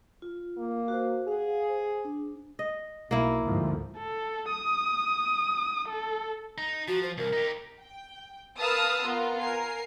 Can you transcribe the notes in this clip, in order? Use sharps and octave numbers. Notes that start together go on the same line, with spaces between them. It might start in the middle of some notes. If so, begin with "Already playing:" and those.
F4
A#3
F#4 C5
G#4 F5 F#5
C5
D4
D#5
B1 A#3 E4
D2 G#2 F3
A4
D#6
A4
D#4
F3 F#4
C5
C2 A#4
D#4 G4
G5
A#4 B4 F5 A5 D#6 E6
B3 F4 A#4
A#4 G#5 C7